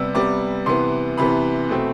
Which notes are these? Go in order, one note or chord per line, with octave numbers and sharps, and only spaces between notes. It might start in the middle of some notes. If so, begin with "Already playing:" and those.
Already playing: C3 G3 B3 E6
C3 G3 B3 D6
C3 E3 B3 C6
C3 E3 B3 B5
B2 A3 C4